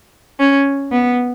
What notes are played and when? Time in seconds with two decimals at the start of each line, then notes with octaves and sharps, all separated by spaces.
0.39 C#4
0.92 B3